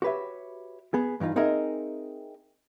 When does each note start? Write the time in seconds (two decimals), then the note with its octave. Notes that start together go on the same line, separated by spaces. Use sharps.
0.02 F#4 G4 B4 C#5 E5
0.94 B3 G#4
1.20 G2 E3 D#4 F4
1.36 C4 D#4 G#4 A#4 D#5 E5